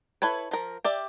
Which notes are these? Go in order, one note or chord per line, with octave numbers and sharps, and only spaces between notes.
E4 A4 B4 C#5
F3 A#4
G4 D5 E5